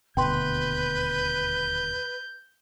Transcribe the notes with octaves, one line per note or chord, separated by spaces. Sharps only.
D#1 D2 B2 B4 G5 C6 G6